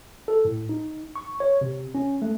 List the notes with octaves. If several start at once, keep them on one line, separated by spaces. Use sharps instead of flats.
A4
A2
D#4
C#6
C#5
C3
C#4
A3